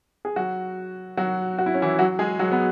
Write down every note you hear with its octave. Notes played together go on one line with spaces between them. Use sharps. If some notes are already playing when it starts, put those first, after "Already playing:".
G#4
F#3 F#4
F#3 F#4
F#4
E4
C#4
E3 E4
F#3 F#4
G#3 G#4
F#3 F#4
B3